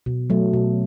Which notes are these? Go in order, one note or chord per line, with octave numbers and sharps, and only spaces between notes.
B2
F#3 A3
B2